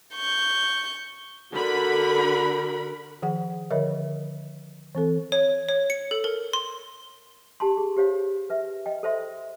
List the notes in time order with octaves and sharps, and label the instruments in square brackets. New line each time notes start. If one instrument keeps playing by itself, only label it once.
[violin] C#6 G6
[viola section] D3 B5 [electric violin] F#4 A#4
[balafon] D#3 F3 G#4 F#5
D3 F3 A#4 C#5 D#5 E5
E3 C4 A4
[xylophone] C#5
C#5
C#7
A4
A#4
C6
[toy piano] G4 A5 C6
G#4
G4 C5 C#5 F5
B4 E5
D#5 G5
A4 C5 E5 C6